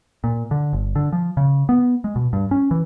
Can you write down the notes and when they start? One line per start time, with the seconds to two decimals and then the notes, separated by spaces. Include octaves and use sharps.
0.24 A#2
0.51 D3
0.73 G1
0.96 D3
1.13 F3
1.37 C#3
1.69 B3
2.04 G#3
2.16 B2
2.33 G2
2.51 C#4
2.71 E3